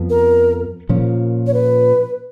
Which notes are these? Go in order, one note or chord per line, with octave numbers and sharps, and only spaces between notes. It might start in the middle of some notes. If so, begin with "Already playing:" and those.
Already playing: F2 F3 B3
A#4
A#2 F3 A#3 C#4
C#5
B4